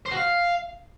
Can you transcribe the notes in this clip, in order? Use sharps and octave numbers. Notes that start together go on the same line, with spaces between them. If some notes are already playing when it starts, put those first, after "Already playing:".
C5
F#4
F5